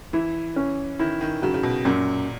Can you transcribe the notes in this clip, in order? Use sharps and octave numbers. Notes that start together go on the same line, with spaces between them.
E3 E4
C#4
D#3 E4
D#3
C#3 F#3
C#3
B2
F#2 A#2